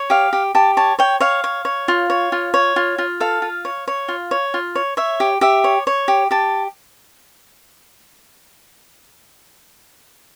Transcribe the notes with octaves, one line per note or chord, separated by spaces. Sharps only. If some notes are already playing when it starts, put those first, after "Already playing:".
Already playing: C#5
G4 F5
G4
G4 A5
C#5 A5
C#5 G5
C#5 F5
C#5
C#5
F4
C#5
F4
C#5
F4
F4
A4 F5
F4
C#5
C#5
F4
C#5
F4
C#5
C#5 E5
G4
G4 E5
C#5
C#5
G4
G4 A5